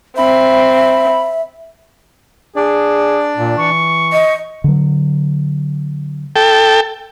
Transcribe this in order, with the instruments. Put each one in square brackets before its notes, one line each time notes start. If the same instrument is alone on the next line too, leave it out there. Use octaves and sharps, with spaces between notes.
[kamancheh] C4 [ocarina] E5 [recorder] B5
[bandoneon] D4 D5 [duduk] G#4
[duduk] A#2
[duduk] E3 [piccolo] C#6
[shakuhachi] D#5
[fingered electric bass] D3 F#3
[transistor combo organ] A4 G5